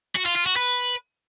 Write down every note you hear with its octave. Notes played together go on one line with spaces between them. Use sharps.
F#4
F4
F4
F#4
B4